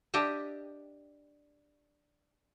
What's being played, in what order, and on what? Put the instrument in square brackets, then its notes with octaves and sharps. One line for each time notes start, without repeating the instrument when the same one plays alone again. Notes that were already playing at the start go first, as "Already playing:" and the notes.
[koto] D4 G4 D#5 E5